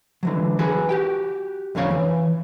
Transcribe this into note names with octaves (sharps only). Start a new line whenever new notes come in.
D3 E3 F#3
F#4 G#4 B4
F#4 G4 G5
F2 D3 C#4 C#5 F5
E3